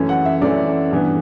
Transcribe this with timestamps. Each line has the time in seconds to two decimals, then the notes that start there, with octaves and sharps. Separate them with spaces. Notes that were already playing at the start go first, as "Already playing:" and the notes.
Already playing: F#2 E3 A3 C#4
0.09 F#5
0.25 E5
0.42 F#2 E3 A3 C#4 D5
0.91 G2 E3 B3